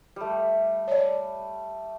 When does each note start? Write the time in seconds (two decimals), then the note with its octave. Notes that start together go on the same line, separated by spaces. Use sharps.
0.16 G3 A3
0.88 C#5 D5